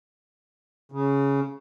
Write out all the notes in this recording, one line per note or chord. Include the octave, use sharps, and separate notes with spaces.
C#3